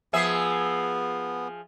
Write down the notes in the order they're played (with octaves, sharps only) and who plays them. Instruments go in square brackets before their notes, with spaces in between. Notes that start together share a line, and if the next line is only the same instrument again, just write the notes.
[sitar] F3 G#4 E5 [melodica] B3